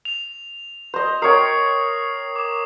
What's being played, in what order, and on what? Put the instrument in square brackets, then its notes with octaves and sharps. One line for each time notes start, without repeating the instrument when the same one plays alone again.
[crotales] F7
[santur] C5 D#5
[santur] A#4 C#5 G5 [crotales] D#6 C7
[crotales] D6 E7